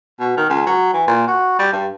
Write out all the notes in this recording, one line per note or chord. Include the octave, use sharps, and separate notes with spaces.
B2
D#3
C#2
F#3
E3
A#2
F#4
G3
G2